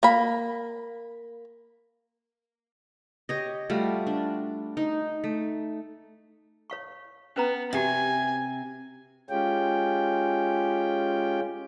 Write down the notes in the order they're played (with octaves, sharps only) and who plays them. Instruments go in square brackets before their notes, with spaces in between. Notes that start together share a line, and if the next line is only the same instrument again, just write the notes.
[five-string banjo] A#3 B5
[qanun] G4 C#5 D#5
G3 A3 F4 F#4
D4
D#4
A3
[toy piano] C#5 F5 C#6
[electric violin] B3 [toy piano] C#4 B4 A#5
[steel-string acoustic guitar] C3 [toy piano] F#4 G4 E5 [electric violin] G#5
[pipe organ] G#3 C#4 F4 G4 G5